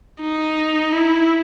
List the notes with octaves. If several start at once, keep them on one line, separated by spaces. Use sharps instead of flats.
D#4
E4